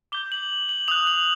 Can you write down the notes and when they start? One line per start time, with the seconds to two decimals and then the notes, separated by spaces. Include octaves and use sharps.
0.12 D6 G6 G7
0.32 F#7
0.69 F#7
0.88 D#6 F#6 F7
1.07 F#7